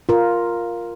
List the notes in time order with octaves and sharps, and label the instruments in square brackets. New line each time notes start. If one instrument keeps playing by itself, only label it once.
[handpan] F4 A#4